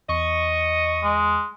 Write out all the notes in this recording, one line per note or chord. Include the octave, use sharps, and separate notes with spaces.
E2 D#5 C#6
G#3